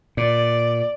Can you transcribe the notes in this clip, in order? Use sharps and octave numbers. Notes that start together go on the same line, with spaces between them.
A#2 D5